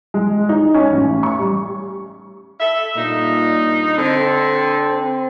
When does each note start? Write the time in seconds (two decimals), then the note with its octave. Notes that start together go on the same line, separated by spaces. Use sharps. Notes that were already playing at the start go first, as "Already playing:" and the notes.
0.14 G#3
0.49 D#4
0.74 C#4
0.93 A1
1.23 C#6
1.39 G3
2.60 A4 E5
2.96 G2 A#2 D#4
3.98 D3 C4